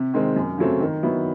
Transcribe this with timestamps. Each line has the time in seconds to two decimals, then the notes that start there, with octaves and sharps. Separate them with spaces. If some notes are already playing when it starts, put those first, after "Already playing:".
Already playing: C3
0.14 D#3 G#3 C4
0.36 F#2
0.58 C#3 F#3 A3 C4
0.81 D#3
1.03 F#3 B3 E4